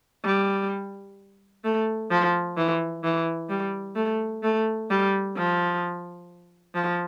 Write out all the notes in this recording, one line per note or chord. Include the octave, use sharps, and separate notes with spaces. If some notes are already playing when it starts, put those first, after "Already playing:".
G3
A3
F3
E3
E3
G3
A3
A3
G3
F3
F3